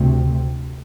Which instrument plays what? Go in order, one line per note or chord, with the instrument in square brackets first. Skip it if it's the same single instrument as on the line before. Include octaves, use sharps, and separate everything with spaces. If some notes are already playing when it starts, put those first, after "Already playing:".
Already playing: [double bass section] D2 C3